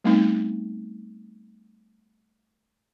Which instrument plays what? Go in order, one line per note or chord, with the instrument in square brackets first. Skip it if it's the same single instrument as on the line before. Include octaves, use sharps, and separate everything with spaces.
[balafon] G3 A3 B3 C4 D#4